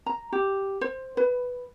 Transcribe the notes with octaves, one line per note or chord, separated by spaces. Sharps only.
A#5
G4
C5
B4